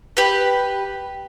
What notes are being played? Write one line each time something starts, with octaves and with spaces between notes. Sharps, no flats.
G4 B4